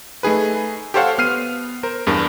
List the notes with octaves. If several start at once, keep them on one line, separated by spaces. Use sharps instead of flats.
A3 D#4 G#4 B4
G4 A4 C5 C#5 F5 F#5
B3 F6 C7 D#7
A#4 C5
E2 G2 A#4